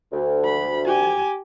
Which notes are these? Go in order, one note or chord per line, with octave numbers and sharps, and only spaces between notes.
D2
B5
G4 G#5